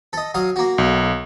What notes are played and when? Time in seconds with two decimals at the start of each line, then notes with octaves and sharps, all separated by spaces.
0.13 A4 D#5
0.34 F#3 F5 D#6
0.56 A#3 F#4
0.78 B1